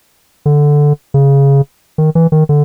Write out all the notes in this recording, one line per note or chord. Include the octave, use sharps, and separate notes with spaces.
D3
C#3
D#3
E3
D#3
D3